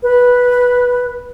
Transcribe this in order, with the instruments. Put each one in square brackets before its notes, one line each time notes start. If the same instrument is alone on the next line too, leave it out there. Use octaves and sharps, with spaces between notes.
[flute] B4